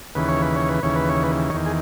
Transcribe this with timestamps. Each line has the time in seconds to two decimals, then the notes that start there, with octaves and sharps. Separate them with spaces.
0.15 D#2 C#3 E3 B4
0.28 C#5
0.42 B4
0.56 C#5
0.69 B4
0.83 D#2 C#3 E3 C#5
0.95 B4
1.09 C#5
1.23 B4
1.50 D#3 C#5
1.54 E2
1.66 G#4